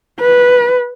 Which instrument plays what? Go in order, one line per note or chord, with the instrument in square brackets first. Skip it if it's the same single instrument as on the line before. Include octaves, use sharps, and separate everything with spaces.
[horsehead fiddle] B4